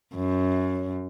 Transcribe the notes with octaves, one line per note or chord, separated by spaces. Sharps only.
F#2